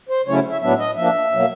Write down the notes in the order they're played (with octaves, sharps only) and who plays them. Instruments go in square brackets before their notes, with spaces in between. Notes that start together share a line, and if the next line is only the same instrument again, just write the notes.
[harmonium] C5
C#3 F#3 A3 C#4 E4 C#5
E5
A2 F#3 B3 D4 E5
D#5
F3 A#3 D4 E5
B2 F#3 A#3